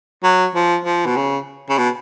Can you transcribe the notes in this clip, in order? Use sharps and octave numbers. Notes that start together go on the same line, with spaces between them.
F#3
F3
F3
B2
C#3
C#3
B2